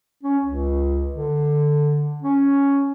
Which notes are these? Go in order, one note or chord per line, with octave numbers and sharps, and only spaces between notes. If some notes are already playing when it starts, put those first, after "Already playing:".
C#4
C#2
D3
C#4